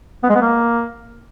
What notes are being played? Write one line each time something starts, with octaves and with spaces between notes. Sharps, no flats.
B3
G#3
B3
A#3